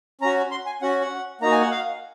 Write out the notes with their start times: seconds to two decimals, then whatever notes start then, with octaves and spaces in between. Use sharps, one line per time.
0.21 C#4 F#4 A#5
0.51 C6
0.66 G#5
0.82 C#4 F#4 F#5
1.01 F#5
1.41 A#3 D#4 F#4 A#5
1.52 G#5
1.61 F#5
1.71 F5